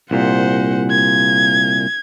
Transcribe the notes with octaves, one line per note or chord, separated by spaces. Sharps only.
C2 A#2 C5 F#5
G#6